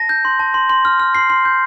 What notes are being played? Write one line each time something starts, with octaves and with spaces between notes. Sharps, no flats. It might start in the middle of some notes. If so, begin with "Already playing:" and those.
Already playing: A5 A#6
G6
C6
A5
C6
C6
F6
F6
C6 C7
C6
G6